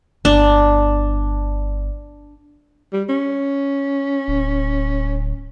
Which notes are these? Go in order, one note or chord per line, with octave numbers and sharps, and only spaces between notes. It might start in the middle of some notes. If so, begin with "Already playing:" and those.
G1 D4
G3
C#4
D1